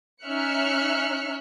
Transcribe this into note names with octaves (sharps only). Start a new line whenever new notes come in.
C#4 D#4 E5 F6 F#6 C#7